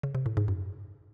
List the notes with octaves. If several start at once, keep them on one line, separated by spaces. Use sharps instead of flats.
C#3
C3
A2
G#2
F#2